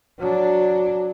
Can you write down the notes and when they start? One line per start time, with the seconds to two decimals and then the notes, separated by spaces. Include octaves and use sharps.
0.19 F#3 D4